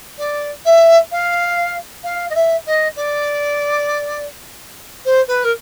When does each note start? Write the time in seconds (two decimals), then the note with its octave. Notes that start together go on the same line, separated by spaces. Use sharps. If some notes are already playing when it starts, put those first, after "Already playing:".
0.18 D5
0.65 E5
1.12 F5
2.04 F5
2.30 D#5
2.35 E5
2.66 D#5
2.96 D5
5.05 C5
5.28 B4
5.44 A#4